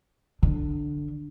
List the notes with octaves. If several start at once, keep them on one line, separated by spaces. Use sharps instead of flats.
D3